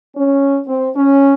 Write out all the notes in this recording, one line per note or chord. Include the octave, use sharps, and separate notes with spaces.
C#4
C4
C#4